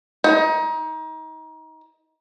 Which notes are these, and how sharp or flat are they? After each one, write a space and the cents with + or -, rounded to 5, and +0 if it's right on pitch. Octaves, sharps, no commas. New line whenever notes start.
D#4 +25